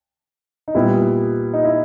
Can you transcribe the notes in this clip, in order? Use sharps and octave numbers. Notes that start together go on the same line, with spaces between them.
D#4
A#2 G3 B3 E4
D#4
E4